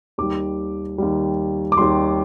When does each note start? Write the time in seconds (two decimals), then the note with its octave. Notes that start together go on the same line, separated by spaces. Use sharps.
0.18 D#2 D#3 G3 D6
0.98 D#2 D#3 G3
1.72 D6
1.77 D#2 D#3 G3 C6